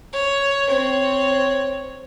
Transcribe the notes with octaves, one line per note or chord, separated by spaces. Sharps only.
C#5
C4 C#5